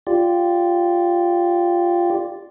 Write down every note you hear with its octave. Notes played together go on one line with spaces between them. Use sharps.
F4 G4 D5